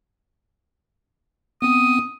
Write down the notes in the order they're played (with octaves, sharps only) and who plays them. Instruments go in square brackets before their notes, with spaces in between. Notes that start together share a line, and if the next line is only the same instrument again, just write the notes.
[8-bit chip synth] B3 C4 [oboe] D#6